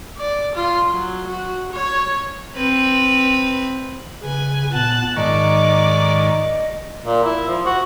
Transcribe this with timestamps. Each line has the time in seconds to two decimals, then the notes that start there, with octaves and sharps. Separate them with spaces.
0.17 D5
0.55 F4
0.90 F#3
1.27 F#4
1.72 C#5
2.56 C4 B4
4.23 C#3 B4 G#5
4.73 A#2 B3 A5 F#6
5.16 G#2 D#3 D5 D#5 C#6 D6
7.06 A#2
7.24 E4
7.48 F3
7.66 F#4